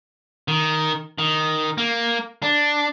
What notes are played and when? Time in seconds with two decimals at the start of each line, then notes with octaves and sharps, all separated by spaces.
0.48 D#3
1.18 D#3
1.78 A#3
2.42 D4